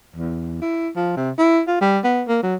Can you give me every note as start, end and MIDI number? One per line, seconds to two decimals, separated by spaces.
0.16 0.57 40
0.62 0.89 64
0.96 1.16 53
1.17 1.31 48
1.38 1.61 64
1.68 1.79 65
1.81 1.99 55
2.04 2.22 59
2.28 2.38 58
2.43 2.55 54